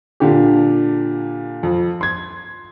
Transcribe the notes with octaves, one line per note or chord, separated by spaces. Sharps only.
A#2 D3 D4 G4
F2
C6 G#6